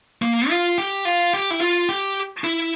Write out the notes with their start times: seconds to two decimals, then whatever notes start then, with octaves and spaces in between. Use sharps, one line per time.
0.22 A#3
0.49 F4
0.78 G4
1.05 F4
1.34 G4
1.51 E4
1.61 F4
1.89 G4
2.44 E4